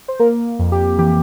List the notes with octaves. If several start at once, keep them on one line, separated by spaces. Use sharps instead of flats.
C5
A#3 A#4
F2
G4
E3 G4